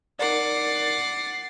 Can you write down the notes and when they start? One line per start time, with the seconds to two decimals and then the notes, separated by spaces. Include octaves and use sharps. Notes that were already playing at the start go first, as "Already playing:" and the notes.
0.19 D#4 A#4 D5 F#5 D6 A6 C7